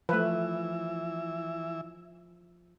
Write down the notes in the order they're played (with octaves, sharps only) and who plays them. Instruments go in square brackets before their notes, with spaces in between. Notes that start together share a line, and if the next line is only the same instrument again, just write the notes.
[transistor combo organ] E3 E5 [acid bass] F3 [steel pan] A3 B4